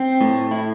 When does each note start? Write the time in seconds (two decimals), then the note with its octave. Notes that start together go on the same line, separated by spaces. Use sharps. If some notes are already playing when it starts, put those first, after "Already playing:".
Already playing: C4
0.21 A2
0.51 E4